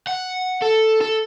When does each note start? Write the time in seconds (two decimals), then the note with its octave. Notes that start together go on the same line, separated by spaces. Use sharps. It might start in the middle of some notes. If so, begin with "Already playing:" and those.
0.07 F#5
0.62 A4
1.01 A4